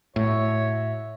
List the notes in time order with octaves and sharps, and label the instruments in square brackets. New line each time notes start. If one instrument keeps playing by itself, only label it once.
[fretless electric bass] A2 [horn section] F#4 E5 [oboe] C#5